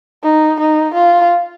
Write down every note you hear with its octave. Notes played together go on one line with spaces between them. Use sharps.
D#4
D#4
F4